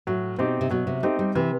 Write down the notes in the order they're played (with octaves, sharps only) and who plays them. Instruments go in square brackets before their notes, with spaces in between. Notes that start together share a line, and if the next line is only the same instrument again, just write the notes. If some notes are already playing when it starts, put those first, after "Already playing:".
[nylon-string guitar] A2 [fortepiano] F#3
[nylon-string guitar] B2 [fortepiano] C4 D#4 G4
[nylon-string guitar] C3
[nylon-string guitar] B2 [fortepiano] F#3
[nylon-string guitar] C3
[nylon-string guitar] A3 [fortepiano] C4 D#4 G4
[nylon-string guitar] G3
[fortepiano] C3 [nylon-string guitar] E3